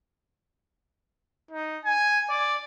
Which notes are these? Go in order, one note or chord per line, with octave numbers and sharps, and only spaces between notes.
D#4
G#5
D5